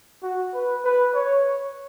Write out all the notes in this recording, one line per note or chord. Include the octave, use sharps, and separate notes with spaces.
F#4
B4
B4
C#5